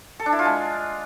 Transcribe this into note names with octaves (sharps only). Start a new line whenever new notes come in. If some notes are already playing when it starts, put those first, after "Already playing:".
A4
D4
E4
F4
G#3